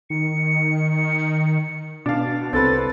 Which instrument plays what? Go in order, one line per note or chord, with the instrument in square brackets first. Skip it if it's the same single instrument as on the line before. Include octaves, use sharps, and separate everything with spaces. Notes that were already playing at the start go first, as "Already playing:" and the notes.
[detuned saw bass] D#3 [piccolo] C#7
[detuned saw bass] B2 [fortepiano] D4 F5
[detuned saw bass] C2 [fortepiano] C4 A4 B4 [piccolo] A6